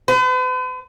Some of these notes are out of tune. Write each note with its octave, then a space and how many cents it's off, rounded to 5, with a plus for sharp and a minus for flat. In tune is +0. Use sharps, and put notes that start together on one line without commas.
B4 +45